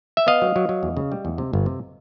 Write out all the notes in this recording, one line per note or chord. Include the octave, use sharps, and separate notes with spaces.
E5
B3 D#5 F5
F#3
F#3
F#3
E2
C#3
G3
E2
C3
G1
C3